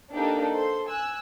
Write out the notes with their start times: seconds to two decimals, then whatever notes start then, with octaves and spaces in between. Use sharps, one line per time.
0.13 A#3 D4 D#4 G4 A4
0.55 A4 C5 C6
0.89 G#5 E6 F#6